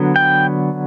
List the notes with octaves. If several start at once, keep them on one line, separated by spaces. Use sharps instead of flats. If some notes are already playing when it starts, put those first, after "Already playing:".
Already playing: D3 F#3 B3
G5